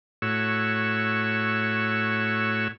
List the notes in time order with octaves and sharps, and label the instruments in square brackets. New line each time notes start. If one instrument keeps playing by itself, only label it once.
[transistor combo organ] A2 F#4 C#5 E6